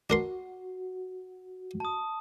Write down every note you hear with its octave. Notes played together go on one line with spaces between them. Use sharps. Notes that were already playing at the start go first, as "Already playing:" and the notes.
D4 F#4 A#4 C6
A5 D#6